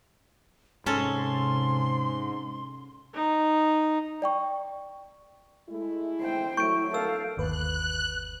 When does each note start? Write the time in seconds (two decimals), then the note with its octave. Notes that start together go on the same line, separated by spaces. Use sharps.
0.86 G#2 C3 C#4 A4 C6
3.14 D#4
4.22 D5 G5 C#6
5.69 G#3 A3 E4
6.20 C5 G5
6.57 F#3 A3 E4 C#6 G6 D7
6.94 A4 A#4 F5 E6
7.37 G1 D#2 B4 F#6